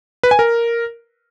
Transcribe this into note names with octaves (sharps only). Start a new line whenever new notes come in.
B4
G#5
A#4